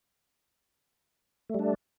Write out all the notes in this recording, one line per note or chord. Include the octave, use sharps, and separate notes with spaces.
G3 A3 D4